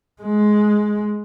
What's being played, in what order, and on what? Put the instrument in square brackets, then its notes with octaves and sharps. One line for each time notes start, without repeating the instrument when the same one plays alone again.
[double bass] G#3